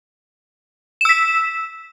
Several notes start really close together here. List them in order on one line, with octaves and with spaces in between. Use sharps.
E7 E6 B6